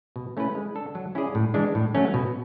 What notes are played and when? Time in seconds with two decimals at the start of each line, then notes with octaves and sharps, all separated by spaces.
0.16 B2
0.37 A3 C#4 E4 B4
0.55 G#3
0.75 D4 A4
0.95 F#3
1.15 C#4 E4 G#4 D5
1.35 A2
1.54 E3 G#3 D4
1.75 A2
1.95 F#3 A3 C#4
2.14 B2